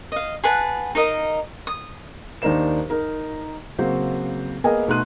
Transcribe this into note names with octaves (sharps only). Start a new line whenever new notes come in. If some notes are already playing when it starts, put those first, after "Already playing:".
D#5 F5
G#4 B4 F#5 A5
D#4 A#4 D#5 F5
D#6
D#2 D4 D#4 A#4 C5 E7
D#4 A#4
C#3 F#3 A#3 C4 F#4 C5
A#3 B3 G#4 A#4 D#5 G#5
B2 A3 D#4 C6 F#6 D#7